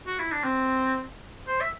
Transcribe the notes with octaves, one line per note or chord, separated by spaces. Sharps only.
F#4
E4
D4
C4
C5
E5